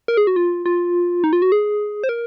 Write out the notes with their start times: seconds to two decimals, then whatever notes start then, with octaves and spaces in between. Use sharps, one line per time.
0.08 A#4
0.17 G#4
0.27 F#4
0.36 F4
0.66 F4
1.24 D#4
1.33 F4
1.42 F#4
1.52 G#4
2.04 C5
2.09 A#4